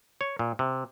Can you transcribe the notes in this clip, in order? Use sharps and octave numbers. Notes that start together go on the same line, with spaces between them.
C#5
A#2
C3